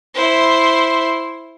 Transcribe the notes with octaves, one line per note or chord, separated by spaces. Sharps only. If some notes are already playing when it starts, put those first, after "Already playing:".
E4 C5